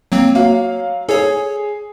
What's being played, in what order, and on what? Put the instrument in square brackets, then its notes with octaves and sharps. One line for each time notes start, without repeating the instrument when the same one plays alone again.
[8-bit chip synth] F#3 A#3 C4
[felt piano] F#3 C#5 F5 [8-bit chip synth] A#3
[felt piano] G#4 [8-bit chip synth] A4 C#5